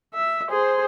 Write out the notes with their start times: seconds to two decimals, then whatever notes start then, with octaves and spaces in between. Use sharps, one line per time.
0.14 E5
0.50 G#4 C5